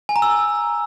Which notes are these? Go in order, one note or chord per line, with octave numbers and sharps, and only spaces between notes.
G#5
A#5
E6